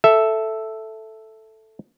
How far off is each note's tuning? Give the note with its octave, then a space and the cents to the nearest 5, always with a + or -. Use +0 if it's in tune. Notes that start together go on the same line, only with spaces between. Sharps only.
A4 +0 E5 +0